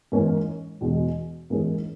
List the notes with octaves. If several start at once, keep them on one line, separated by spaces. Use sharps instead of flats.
G#2 E3 A#3 C#4
E2 B2 G#3
G#2 E3 A#3 C#4 G#4